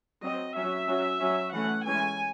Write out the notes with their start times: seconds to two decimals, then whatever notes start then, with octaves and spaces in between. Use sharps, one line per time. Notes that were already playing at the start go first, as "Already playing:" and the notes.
0.22 F#3 C4 D#5
0.55 F#3 C#4 E5
0.88 F#3 C#4
1.20 F#3 C#4
1.53 E3 A3 C#4 F#5
1.85 E3 G#3 C#4 G#5